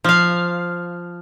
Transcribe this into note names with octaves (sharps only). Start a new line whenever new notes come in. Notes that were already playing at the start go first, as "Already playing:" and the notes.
F3 F5